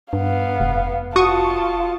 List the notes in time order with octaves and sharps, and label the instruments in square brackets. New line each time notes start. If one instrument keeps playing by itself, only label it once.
[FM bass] G2 [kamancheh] B3 F5
[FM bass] F1
[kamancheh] F4 A5 [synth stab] F#4 C#6 D#6